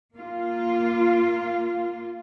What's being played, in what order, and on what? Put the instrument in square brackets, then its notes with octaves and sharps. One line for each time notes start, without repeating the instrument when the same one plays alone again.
[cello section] A#3 F4